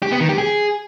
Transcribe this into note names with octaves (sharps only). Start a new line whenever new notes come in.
G4
B3
D#3
G4
G#4